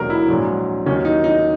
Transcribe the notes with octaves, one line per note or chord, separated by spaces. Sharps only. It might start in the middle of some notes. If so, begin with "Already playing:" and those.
Already playing: E1 D#2 D#3 F#3 A#4
E4
A#1 G#2 F#3
D#2 D#3 F#3 C#4
D#4
D#4